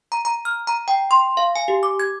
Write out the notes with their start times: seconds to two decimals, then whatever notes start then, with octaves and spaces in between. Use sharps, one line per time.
0.12 A#5
0.25 A#5
0.45 F6
0.67 A#5
0.88 G5
1.11 C6
1.37 F5
1.56 G#5
1.68 G4
1.83 D6
2.00 G#6